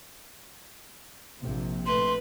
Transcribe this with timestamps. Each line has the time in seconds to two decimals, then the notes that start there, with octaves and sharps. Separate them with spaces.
1.39 A#1 C3
1.86 A3 B4 C6